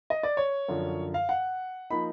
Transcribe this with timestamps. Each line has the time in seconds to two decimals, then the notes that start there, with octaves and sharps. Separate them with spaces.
0.10 D#5
0.23 D5
0.37 C#5
0.68 F#2 D3 F3
1.14 F5
1.29 F#5
1.90 F3 A#3 D#4 B5